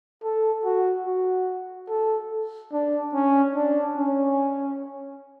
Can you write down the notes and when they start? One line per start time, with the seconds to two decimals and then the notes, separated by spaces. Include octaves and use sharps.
0.23 A4
0.65 F#4
1.06 F#4
1.89 A4
2.72 D4
3.14 C#4
3.55 D4
3.97 C#4